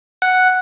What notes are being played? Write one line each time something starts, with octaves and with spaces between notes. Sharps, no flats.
F#5